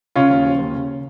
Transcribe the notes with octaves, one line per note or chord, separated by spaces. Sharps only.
C#3 C#4 F4
D#2
F3
D#2
C#3